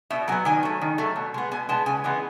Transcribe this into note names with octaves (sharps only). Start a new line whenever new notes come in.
B2 E5
F#3 B3 G#5
D#3 G#5
F#3 A3
D#3
F#3 A3
B2
G#3 B3
B2 G#5
G#3 B3 A5
C#3 G#5
E3 G#3 B3